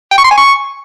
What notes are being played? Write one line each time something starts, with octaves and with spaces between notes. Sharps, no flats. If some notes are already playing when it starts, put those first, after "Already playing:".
G5
C#6
C6
G#5
C#6